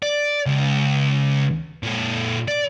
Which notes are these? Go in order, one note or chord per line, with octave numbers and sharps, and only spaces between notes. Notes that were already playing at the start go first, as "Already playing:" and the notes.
D5
C#2
A#2 A4
D5